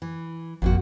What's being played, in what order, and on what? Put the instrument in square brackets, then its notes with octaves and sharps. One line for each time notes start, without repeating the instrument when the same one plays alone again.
[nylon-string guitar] E3
[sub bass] G#1 [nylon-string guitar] F2 A#3 F#4